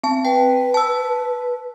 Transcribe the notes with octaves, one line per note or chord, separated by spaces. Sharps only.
C4 A5
B4 G5
A5 E6